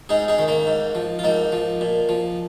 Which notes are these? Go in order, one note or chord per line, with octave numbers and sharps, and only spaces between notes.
G#2 D#4 G#4
D#4 G#4
D#3
A#3 D#4
G#2
F3
F4
G#2 A#3 D#4
F3
A#2
F3